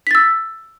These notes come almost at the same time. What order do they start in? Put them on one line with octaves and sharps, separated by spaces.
B6 A6 E6